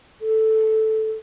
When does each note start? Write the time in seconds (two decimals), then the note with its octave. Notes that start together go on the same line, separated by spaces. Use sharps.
0.21 A4